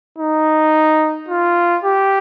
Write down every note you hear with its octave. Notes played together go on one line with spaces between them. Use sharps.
D#4
F4
G4